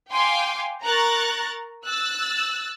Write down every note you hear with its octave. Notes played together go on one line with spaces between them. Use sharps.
F5 G5 G#5 C6 D6
A#4 A#5 C#6 F#6 A6
E6 F#6 A6